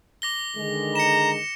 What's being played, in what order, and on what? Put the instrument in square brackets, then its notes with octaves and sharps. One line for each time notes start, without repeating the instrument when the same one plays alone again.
[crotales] D6 A#6 G7
[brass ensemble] D3 D#3 G#3
[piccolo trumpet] A#5 [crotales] C#7 E7